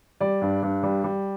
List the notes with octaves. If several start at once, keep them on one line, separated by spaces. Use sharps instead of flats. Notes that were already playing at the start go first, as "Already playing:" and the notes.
G3 D5
G2
G2
G3
G3